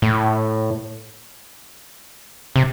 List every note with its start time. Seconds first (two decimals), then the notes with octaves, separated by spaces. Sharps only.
0.02 A2
2.56 C3